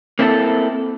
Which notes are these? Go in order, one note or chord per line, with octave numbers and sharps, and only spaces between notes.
A#3 C4 E4 F4 A4